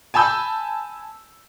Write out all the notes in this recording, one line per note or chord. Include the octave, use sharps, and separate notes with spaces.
G#5 A5 B5 E6 G6